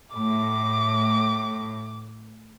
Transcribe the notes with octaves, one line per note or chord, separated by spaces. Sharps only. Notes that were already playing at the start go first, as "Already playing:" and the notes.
A2 D6